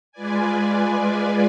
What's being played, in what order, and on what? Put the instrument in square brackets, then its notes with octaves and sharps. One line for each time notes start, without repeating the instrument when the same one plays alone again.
[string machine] G#3 F4 B4 D5 G#5